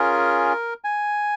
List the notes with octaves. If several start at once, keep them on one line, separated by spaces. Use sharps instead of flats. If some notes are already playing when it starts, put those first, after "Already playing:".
Already playing: C#4 F4 G#4 A#4
G#5